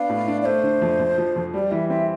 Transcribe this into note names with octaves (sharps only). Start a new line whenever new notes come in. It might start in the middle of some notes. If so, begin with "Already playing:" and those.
Already playing: B3 D4 F5
A2
D4
D5
A3 C5
D3
F2
F2
F3
F2
G3 D5
E3 E5
C4 E5